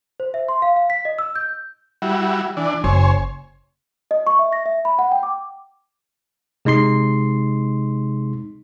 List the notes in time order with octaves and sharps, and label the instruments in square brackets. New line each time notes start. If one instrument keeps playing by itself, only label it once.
[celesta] C5
E5
C6
F5
F5
B6
D#5
E6
G6
[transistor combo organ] G3 E4 F#4
E3 D4
[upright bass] F#1 [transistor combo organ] C5 C#5 G#5
[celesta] D#5
C#6
E5
A#6
E5
B5
F#5
G5
D6
[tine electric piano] C3 G#3 D#4 C6 C7